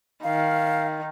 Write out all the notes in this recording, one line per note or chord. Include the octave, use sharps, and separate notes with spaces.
D#3 F5